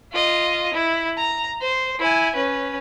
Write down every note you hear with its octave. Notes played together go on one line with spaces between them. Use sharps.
F4 D#5
E4
A#5
C5
E4 G#5
C#4 B4